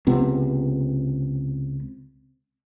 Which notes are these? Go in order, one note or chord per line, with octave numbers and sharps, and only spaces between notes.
C#2 C3 B3